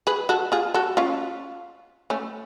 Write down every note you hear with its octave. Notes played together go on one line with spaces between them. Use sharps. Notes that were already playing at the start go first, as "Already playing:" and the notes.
G#4 B4
F#4 A4
F4 G#4
F#4 A4
C#4 F4
A3 C#4